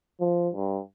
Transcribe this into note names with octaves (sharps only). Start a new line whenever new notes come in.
F3
G2